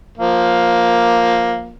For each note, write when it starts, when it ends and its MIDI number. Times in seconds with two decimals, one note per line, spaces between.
0.18 1.75 53
0.18 1.75 58